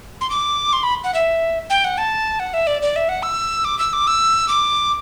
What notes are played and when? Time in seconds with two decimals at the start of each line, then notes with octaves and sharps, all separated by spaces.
0.21 C6
0.30 D6
0.73 C6
0.83 B5
1.04 F#5
1.14 E5
1.70 G5
1.84 F#5
1.98 A5
2.39 F#5
2.54 E5
2.67 D5
2.82 D5
2.96 E5
3.09 F#5
3.23 E6
3.65 D6
3.78 E6
3.93 D6
4.07 E6
4.48 D6